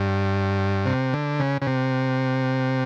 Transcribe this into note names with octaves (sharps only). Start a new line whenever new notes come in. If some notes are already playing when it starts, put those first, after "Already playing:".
Already playing: G2
C3
D3
C#3
C#3
C3